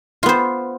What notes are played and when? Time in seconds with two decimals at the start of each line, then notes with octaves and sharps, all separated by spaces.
0.23 F4
0.26 B3
0.29 C5